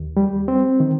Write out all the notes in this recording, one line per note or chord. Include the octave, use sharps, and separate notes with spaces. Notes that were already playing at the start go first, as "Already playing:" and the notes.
Already playing: D#2
G3
C4
D#3